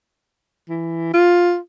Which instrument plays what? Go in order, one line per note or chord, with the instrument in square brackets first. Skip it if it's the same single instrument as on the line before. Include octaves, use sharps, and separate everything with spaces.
[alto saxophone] E3
F4